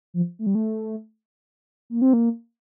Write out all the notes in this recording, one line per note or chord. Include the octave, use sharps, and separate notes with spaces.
F3
A3
G3
A3
A#3
C4
A#3